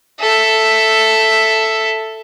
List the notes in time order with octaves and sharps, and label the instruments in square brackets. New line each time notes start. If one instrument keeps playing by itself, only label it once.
[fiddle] A4 E5